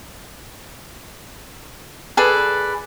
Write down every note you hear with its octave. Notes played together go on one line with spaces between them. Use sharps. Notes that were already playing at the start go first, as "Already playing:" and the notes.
G#4 A4 B4 D5